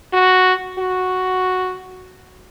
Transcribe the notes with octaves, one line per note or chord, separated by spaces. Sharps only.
F#4
F#4